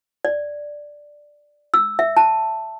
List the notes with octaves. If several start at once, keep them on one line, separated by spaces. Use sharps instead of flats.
D5
E6
E5
A5